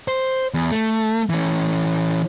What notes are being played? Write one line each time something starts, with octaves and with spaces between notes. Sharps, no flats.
C5
E2
A3
E3 C#4